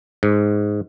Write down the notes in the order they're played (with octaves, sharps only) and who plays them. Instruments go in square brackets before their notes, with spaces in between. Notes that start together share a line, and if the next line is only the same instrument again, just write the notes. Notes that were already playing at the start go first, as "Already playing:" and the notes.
[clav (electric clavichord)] G#2